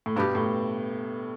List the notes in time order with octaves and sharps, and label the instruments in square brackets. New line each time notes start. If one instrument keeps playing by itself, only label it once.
[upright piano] A2
[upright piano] G2 [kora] B2 B3 G4
[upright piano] A2